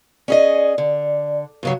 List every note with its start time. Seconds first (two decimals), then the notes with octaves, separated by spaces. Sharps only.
0.28 C#4 G#4 D5 D#5
0.78 D3
1.63 G2 C#3 F#3